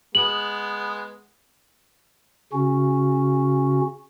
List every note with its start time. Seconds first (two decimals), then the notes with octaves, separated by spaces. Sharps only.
0.15 G#3 B3 F#7
2.53 C#3 C#4 F#4